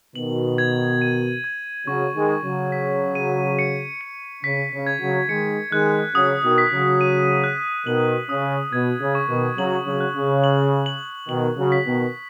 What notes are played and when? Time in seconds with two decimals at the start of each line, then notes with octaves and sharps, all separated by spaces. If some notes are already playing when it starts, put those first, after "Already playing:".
0.15 B2 D#3 F#7
0.58 G#6
1.02 D#7
1.44 G#6
1.87 C#3 F#3 C#6
2.16 D#3 G#3
2.30 C#6
2.44 C#3 F#3
2.72 B6
3.15 D#7
3.59 C#7
4.01 C#7
4.44 C#3 B6
4.73 C#3
4.87 G#6
5.01 C#3 F#3
5.29 D#3 G#3 C#7
5.72 D#3 G#3 F#6
6.15 C#3 F#3 D#6
6.44 B2 D#3
6.58 B6
6.72 C#3 F#3
7.01 D#7
7.44 F#6
7.87 B2 D#3 F#7
8.29 C#3 D#6
8.72 B2 G#6
9.00 C#3
9.15 C#6
9.29 B2 D#3
9.57 C#3 F#3 F#7
9.86 C#3 F#3
10.01 F#6
10.15 C#3
10.44 F#7
10.86 F#7
11.29 B2 D#3 F#7
11.57 C#3 F#3
11.72 B6
11.86 B2 D#3